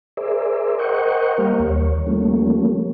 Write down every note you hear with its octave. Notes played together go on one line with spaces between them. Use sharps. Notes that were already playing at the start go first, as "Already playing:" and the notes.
G#4 A#4 C5 D5 E5
A#4 C5 D#5 F#5 G5 C#6
G3 A#3 G4 A#4 F5
D#2 C#5
F3 G3 A3 A#3 C#4